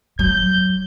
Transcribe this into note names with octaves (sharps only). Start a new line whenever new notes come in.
F#3 G6